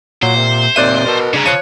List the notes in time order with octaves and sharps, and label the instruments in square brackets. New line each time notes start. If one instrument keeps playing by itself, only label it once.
[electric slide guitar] A#2 [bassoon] F#3 [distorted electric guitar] C5
[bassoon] C3
[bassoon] D#2 [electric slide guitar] A#2 C4 E5 [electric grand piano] D5 F#6 D#7
[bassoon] B2 [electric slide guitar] A#4 A5
[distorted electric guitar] C#3 [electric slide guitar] D4 G#4 A#5
[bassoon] F3 [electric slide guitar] C#5 [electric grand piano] F#6 C#7 D#7